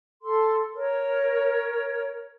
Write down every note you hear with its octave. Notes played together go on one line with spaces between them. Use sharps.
A4 C6
A#4 C#5